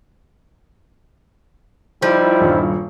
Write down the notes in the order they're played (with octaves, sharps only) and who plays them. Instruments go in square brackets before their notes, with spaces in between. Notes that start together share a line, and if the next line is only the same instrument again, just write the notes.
[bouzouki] F3 [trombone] G3 [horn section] D#4 E4
[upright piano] D#1 G2